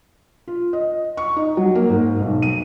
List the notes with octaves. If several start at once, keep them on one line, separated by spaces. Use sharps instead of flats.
F4
D#5
C#6
D#4
F#3
A#3
G#2
B1
D#7